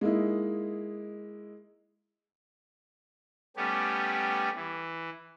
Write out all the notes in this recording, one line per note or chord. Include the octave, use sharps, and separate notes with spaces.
G#3 A#3 D#4 E4
G3 A3 B3 C#4 G4
E3